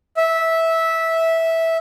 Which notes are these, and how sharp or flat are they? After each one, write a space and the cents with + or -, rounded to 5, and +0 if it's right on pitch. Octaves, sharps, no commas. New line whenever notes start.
E5 -10